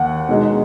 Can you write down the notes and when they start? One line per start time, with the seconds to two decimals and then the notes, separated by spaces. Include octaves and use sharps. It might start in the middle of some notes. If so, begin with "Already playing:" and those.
Already playing: D#2 F#5
0.29 B2 G#3 D#4